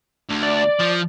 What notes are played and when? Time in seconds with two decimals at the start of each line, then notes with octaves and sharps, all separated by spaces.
0.29 D2
0.43 D5
0.80 F3